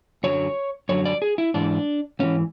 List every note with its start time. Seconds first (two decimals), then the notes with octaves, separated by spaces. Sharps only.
0.24 F#2 D3 F#3 C#5
0.89 F#2 D3 F#3 C#5
1.05 D5
1.22 G#4
1.38 E4
1.54 G#2 E3 D4
2.19 G#2 E3 C#4